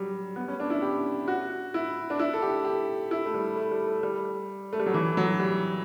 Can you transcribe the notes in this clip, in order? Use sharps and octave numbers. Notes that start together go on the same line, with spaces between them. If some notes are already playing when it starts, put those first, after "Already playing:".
Already playing: F#3 G3
B3
C#4
D4
E4
G4
F#4
E4
D4
E4
A4
G4
G4
E4
A3
G3
A3
G3
A3
G3
A3
G3
F#3
E3
F#3
G3